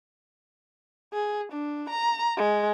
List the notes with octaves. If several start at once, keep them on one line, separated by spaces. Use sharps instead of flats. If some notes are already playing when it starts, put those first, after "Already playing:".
G#4
D4
A#5
G#3